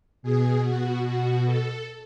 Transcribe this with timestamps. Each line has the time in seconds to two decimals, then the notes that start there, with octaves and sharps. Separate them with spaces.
0.23 B2 G#4
0.63 F#4
1.04 F#4
1.45 A4